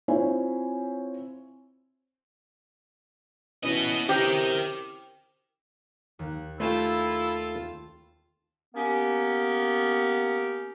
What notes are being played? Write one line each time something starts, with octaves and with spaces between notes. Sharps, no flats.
C4 E4 F4 C5 C#5 G#5
E3 B3 C#4 E4 F#4 D#5
C3 G4 A#4 G5
D#2 F#6
A3 E4 F4 G4 G5 A5 C6
A#3 B3 C#4 G4